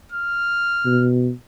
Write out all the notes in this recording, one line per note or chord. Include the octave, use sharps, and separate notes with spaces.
F6
B2